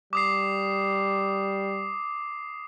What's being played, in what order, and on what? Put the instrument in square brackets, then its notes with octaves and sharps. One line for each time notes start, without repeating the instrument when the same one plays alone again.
[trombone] G3 [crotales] D6 D#6 C7